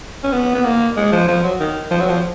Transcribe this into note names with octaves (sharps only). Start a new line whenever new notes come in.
C#4
B3
B3
A#3
G#3
F3
F3
F#3
D#3
F3
F#3
F3